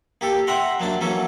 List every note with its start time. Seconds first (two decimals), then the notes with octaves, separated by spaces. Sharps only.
0.21 A#3 G4 A4
0.47 E5 F#5 G5 A#5 C6
0.80 F#3 A#3 D4 A5
1.01 E3 F#3 A#3 C#4 A4